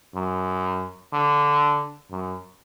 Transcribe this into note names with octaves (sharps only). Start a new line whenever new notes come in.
F#2
D3
F#2